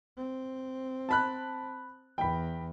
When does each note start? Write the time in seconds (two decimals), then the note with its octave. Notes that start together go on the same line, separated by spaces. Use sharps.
0.17 C4
1.09 A5 B5 F#6
2.18 E2 G5 B5